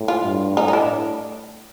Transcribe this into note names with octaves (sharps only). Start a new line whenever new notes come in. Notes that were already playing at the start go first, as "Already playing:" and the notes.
Already playing: A2
F4
G2
A2 D#4
D#4
D4